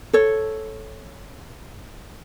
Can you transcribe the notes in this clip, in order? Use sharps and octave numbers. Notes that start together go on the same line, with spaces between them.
A4 C#5